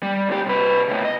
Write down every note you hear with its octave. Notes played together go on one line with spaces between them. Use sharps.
G3
D2 G4
C3 B4
A2 C#3
D#5